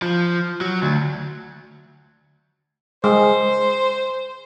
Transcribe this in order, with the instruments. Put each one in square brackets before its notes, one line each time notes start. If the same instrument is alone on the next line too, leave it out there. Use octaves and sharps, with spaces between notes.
[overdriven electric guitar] F3
F#3
D2
[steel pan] G#3 [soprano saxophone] C5